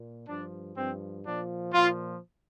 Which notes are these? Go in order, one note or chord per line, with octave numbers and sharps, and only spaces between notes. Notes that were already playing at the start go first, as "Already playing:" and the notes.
Already playing: A#2
G2 F3 D4
G2 F3 C4
A#2 F3 D4
A#2 F3 F4